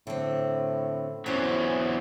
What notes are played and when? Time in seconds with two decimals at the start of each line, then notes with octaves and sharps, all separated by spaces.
0.07 A2 D3 C4
1.26 E2 F#3 C#4 C5 D5